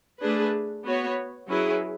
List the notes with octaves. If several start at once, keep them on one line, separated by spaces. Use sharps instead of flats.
A3 D4 G#4 B4
B3 F#4 C#5
F#3 C#4 E4 G#4 B4